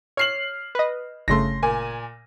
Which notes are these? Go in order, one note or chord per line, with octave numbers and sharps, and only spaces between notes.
C#5 F6 C7 F#7
B4 D#5
G1 C#3 A3 C6 A#6
A#2 G#5